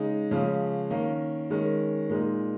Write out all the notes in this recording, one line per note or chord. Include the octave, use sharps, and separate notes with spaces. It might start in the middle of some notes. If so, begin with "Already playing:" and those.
Already playing: C#3 G#3 D#4
C#3 F3 G#3 C#4
D#3 A#3 C#4
D#3 G#3 C#4
A#2 G#3 D#4